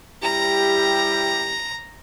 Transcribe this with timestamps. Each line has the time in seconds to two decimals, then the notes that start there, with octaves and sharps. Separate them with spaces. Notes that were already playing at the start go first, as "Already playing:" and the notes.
0.23 G3 E4 G4 A#5